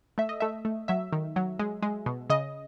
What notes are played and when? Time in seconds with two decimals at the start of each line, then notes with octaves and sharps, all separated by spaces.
0.18 A3 E5
0.29 D#5
0.40 A3 E5
0.65 A3
0.88 F#3 E5
1.13 D#3
1.36 F#3
1.59 G#3
1.82 G#3
2.06 B2
2.30 C#3 D#5